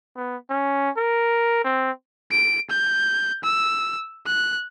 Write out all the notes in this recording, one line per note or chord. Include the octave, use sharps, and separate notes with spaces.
B3
C#4
A#4
C4
D7
G6
E6
F#6